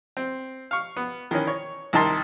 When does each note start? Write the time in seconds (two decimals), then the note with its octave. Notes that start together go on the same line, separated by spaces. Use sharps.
0.17 C4
0.71 F5 C#6
0.96 B3
1.31 D#3 E3 C#4
1.47 C#5
1.93 C2 D#3 D#4 A5 C6